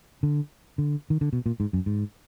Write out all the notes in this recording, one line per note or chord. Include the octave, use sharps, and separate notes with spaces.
D3
D3
D#3
D3
B2
A#2
G#2
F#2
G#2